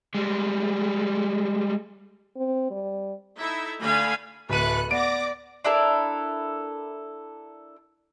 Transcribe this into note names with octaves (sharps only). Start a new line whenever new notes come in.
G3 G#3
C4
G3
D#4 E4 A4 E5
D3 A3 F5 G#5 B5
D1 A3 B4 F#6 C#7 D#7
B3 D5 D6 A#6 D7
D4 E4 A4 A#4